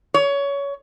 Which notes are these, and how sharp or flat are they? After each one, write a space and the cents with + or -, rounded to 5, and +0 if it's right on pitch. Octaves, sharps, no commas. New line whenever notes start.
C#5 +20